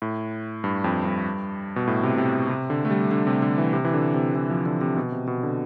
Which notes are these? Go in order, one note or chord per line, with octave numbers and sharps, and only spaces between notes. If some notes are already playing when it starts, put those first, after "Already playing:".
A2
G2
F2
G2
B2
A2
C3
C3
C3
D3
A3
G3
D3
C3
D3
E3
C3
E3
D3
C3
E3
F3
D3
C3
B2
C3
B2
D3